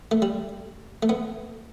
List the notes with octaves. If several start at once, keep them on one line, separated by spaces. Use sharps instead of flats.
A3
G3
A3
B3